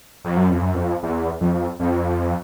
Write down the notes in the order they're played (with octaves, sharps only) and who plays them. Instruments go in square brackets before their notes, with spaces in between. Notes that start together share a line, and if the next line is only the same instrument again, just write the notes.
[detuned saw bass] F2
F#2
F2
F#2
F2
E2
F2
F2